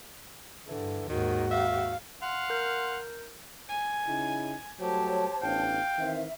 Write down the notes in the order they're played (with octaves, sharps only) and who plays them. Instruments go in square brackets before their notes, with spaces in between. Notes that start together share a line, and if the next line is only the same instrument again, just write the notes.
[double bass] G2 D3 [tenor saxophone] E3
[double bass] D#2 G#2 [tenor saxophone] D#3 [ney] F#4
[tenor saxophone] E5 [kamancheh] F5
[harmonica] F5 F#5 C6
[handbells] A#4 G6
[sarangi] G#5
[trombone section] C#3 D#4 E4
[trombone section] F#3 G3 A3 [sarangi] G4 [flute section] C5 C#5 A5
[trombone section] A1 B3 D4 [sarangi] F5 [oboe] G5
[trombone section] D#3 E3 C4 [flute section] E5